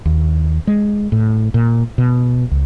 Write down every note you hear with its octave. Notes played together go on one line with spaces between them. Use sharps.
D#2
G#3
A2
A#2
B2
C#2